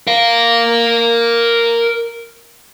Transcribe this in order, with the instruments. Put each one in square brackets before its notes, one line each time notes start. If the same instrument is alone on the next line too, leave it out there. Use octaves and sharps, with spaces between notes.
[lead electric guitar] A#4 F5